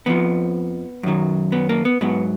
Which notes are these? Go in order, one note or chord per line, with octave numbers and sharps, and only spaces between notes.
F2 F3 B3
F#2 D#3 F#3
B3
A#3
B3
G#2 F#3 B3